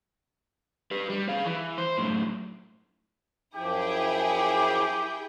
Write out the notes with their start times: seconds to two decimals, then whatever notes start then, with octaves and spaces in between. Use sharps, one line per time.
0.91 G4 B4
1.10 G3
1.29 G#4 F5
1.46 E3
1.78 C5
1.98 F#2 A2
3.55 F#2 F3 E4 G4 G#4 G5